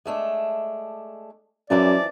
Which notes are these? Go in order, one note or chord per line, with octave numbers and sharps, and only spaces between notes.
G#3 A3 D4
F#2 E3 F3 D4 D5